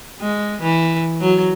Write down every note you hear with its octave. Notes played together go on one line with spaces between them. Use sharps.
G#3
E3
F#3